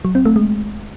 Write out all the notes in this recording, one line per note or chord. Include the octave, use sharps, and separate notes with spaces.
F#3
C4
A3
G#3